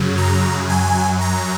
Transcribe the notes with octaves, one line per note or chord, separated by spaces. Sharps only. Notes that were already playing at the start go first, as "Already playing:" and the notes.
Already playing: F#2 C#3 F#3
A#5
F#2 F#3 G#5
A#5